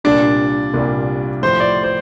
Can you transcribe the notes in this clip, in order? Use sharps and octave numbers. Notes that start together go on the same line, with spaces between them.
C2 A#2 G3 D4
C2 A#2 G3
A2 F3 C5
D5
C5